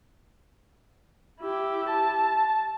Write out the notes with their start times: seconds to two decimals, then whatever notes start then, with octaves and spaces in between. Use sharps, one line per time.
1.40 E4 G4
1.89 A5